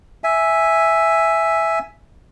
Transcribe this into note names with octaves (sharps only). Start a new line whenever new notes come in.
E5 G#5